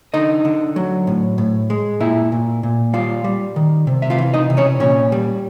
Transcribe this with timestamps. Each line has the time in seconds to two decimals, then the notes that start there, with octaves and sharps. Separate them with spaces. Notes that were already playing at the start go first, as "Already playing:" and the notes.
0.14 D3 D#4 D#5
0.45 D3
0.76 F#3
1.07 A2
1.38 A2
1.70 G#3
2.00 A#2 E4 E5
2.32 A#2
2.63 A#2
2.93 G3 F4 F5
3.24 G3
3.56 D#3
3.87 C3
4.02 E5
4.10 F4 F5
4.18 E3
4.34 D#4 D#5
4.50 C3
4.57 C#4 C#5
4.80 A#2 C#4 C#5
5.12 G3